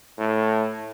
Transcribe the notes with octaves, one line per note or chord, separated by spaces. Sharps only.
A2